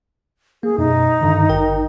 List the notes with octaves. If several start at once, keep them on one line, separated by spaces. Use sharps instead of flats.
A#3 G#4
F#2 B2 D#4
G2 D3 D#3
G#1 A#4 G5